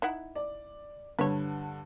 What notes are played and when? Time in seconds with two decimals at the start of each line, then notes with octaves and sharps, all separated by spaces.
0.02 D#4 E4 F#5
0.35 D5
1.19 G2 D3 B4 C#5